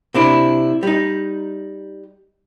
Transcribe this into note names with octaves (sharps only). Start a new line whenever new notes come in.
C3 D4 E4
G3 D#4